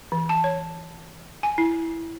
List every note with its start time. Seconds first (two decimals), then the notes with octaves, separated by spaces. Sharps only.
0.12 E3
0.29 A5
0.44 C#5
1.43 G#5
1.58 E4